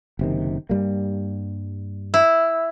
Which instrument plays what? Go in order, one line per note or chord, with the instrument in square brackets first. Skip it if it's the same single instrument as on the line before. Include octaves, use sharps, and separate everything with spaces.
[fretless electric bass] F#1 C3 D#3
G2 G3 A#3
[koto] E4